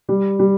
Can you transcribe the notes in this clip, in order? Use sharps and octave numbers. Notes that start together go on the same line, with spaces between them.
G3
G3